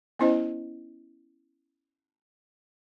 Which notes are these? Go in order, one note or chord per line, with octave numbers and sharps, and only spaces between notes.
B3 C#4 E4 C5 D#5